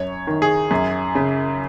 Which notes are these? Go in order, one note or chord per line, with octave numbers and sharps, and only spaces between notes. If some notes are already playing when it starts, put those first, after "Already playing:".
Already playing: F#2 C#5
D#3
G#4
F#2
C#3